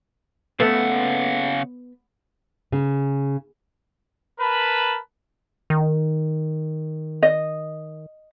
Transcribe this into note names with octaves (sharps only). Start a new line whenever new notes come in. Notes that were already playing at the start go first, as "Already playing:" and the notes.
C#3 A3 B3 F#5
C#3
A#4 B4 A5 B5
D#3
D#5